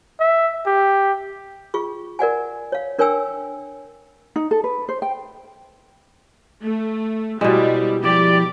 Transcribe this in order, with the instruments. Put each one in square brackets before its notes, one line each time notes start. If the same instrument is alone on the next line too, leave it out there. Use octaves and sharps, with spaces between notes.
[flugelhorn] E5
G4
[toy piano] F4 G#4 C#6
A#4 D5 F#5 G#5
C#5 F5
D4 A#4 C#5 G5 G#5 E6
[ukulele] D#4
A4
B4
C5
G5
[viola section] A3
[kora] B2 G#3 [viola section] G3 [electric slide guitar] E4 C5 D5
[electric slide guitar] F3 E4 [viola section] G4 [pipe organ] D5